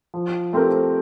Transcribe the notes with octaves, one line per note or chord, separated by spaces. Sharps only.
F3
A3 C4 G4 A#4